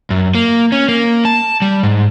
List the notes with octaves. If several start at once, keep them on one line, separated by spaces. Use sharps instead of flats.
F#2
A#3
C#4
A#3
A5
G3
G#2